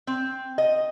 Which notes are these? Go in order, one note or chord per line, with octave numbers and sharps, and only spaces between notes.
C4
D#5